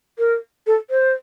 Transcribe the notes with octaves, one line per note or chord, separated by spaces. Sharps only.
A#4
A4
C5